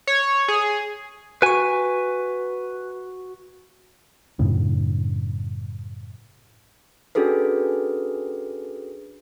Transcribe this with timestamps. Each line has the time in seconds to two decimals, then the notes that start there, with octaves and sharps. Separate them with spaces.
0.07 C#5
0.48 G#4
1.42 F#4 B4 G#5 C#6
4.39 F#2 A2 C#3
7.15 C#4 D4 F#4 G#4 A4 B4